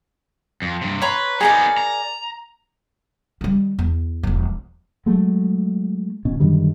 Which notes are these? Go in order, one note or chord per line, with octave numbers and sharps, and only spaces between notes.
F2
G2 C3
B4 C#5 A#5 C6
B3 D#4 G#4 A#4 D5
A#5
D#3 G3
E2
E1 F3
F#3 G#3 A3
D#1 B2 C#4
F#2 D3 D#3 G3